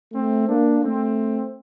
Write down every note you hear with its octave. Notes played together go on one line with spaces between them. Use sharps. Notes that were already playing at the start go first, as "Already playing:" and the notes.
A3 C4
A#3 D4
A3 C4